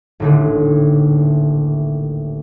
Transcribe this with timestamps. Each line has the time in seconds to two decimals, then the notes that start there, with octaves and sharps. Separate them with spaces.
0.20 D#1 A1 D3